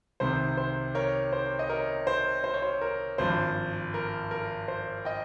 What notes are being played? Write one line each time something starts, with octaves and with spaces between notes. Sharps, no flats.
C2 C3 D#3 C5
C5
A#4 C#5
C5
D#5
A#4 C#5
C5
C5
C#5
C5
A#4
G#1 G2 F3 C5
A#4
A#4
C5
D#5 G5